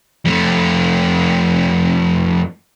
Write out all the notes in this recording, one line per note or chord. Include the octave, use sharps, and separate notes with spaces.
F2 A3